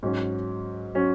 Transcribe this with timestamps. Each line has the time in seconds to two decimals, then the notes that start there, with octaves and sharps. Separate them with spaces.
0.03 G#2 F#3 C#4
0.95 F#3 C#4